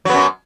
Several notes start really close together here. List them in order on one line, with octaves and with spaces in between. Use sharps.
F#3 B3 F#2